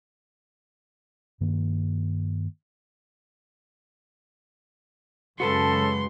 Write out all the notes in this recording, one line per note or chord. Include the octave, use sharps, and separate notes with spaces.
G2 D#3 A#3
F#2 C#3 G#3 F#4 A4 B4 A5 C6